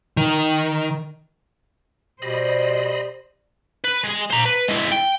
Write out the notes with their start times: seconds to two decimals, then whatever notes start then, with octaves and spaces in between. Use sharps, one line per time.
0.17 D#3
2.22 B2 G3 C5 D#5 B5
3.84 B4
4.04 G#3
4.31 C5 A#5
4.45 B4
4.68 G#3 E4
4.92 G5